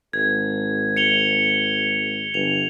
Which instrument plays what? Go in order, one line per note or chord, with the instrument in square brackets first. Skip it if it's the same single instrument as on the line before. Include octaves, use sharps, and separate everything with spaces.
[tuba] G#1 [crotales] G#6
[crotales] C#7 F7 G7
[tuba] G1 [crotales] F7